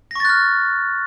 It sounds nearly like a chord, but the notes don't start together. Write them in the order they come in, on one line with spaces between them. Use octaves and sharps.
A#6 C#6 A6 F#6 F6